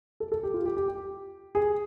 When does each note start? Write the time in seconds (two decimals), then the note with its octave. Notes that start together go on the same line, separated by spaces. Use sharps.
0.20 A4
0.32 A4
0.43 G4
0.54 F4
0.66 G4
0.77 G4
0.88 G4
1.55 G#4